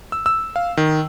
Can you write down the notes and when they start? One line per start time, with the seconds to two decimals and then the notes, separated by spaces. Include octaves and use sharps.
0.12 E6
0.26 E6
0.56 F5
0.77 D#3